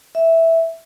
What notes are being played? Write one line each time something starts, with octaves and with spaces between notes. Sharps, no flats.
E5